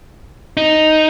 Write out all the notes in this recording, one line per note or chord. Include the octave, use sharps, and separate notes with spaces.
D#4